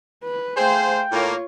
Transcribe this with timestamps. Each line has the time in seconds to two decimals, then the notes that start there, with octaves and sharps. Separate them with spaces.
0.24 B4
0.57 A3 G#4 C5 F5 G5
1.12 A2 A#3 F4 C#5